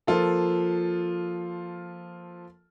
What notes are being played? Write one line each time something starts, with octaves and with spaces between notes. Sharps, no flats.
F3 A#3 F4 A4